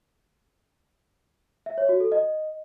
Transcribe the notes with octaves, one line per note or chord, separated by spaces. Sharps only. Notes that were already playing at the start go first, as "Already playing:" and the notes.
E5
C#5
F#4
A4
D#5